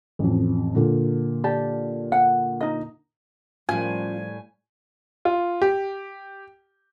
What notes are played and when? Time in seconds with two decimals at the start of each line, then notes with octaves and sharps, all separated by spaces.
0.19 A1 F2
0.75 A#2 D3
1.44 G4 D5 A5
2.12 F#5
2.61 D#4 D#5
3.69 A2 F3 G3 A3 C#4 F4 G#5
5.25 F4
5.62 G4